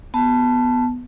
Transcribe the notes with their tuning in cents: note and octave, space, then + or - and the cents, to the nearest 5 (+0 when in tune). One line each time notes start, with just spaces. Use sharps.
B3 +0 A5 +0